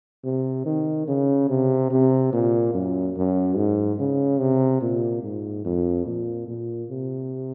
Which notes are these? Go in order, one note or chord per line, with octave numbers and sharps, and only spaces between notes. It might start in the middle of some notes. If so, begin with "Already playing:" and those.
C3
D#3
C#3
C3
C3
A#2
F#2
F#2
G#2
C#3
C3
A#2
G#2
F2
A#2
A#2
C3